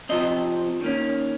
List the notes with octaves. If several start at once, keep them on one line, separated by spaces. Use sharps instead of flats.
C3 F3 C4 D#5
D#3 A#3 C#4